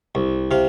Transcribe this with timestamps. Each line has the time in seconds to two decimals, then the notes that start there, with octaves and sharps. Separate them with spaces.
0.15 C2
0.51 C3 F5